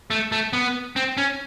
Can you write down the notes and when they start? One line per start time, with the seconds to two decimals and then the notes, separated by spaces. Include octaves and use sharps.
0.10 A3
0.32 A3
0.53 B3
0.96 C4
1.17 C#4